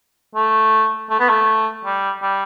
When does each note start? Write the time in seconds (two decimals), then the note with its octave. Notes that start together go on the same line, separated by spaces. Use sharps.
0.35 A3
1.10 A3
1.20 B3
1.29 A3
1.85 G3
2.22 G3